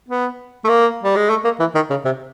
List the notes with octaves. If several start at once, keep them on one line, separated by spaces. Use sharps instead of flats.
B3
A3
A#3
G3
G#3
A3
A#3
E3
D#3
C#3
C3